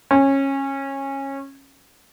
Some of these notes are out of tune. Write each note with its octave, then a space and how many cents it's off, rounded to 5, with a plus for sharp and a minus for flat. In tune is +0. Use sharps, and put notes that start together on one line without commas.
C#4 -20